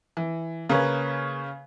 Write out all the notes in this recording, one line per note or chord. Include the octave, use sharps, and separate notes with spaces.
E3
C#3 A#3 C#4 B4